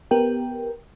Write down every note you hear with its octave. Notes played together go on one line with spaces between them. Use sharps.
B3 G4 A#4 G5